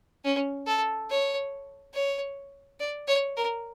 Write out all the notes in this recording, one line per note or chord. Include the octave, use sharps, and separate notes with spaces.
C#4
A4
C#5
C#5
D5
C#5
A#4